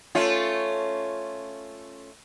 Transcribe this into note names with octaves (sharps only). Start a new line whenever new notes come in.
A3 C#4 F4